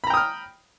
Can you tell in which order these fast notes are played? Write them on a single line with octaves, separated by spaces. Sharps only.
B5 A#5 G5 D#6 F6